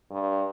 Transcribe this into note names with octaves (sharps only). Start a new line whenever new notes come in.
G2